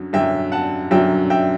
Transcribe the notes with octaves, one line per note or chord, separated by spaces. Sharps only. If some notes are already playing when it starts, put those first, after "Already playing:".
Already playing: F#2 D3 F#3
F#2 D3 F#3 E5 G5
F#5 A5
F#2 D3 F#3 E5 G5
E5 G5